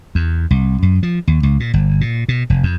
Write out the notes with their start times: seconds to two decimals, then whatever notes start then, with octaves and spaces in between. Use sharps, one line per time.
0.15 E2
0.51 C2
0.82 F#2
1.03 F3
1.27 D#2
1.43 C#2
1.60 A#2
1.74 G1
2.01 A#2
2.29 B2
2.50 F1
2.63 F2